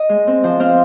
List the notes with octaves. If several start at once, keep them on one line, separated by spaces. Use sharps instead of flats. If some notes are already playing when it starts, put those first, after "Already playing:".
Already playing: D#5
G#3
C4
F3
C4 F5